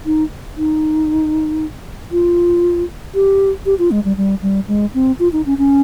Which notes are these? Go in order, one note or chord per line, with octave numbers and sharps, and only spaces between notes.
D#4
D#4
F4
G4
G4
F4
G#3
G3
G3
G3
G#3
C4
F4
D#4
C#4
C#4